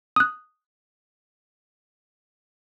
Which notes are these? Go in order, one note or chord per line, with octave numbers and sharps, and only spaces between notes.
D#6 F#6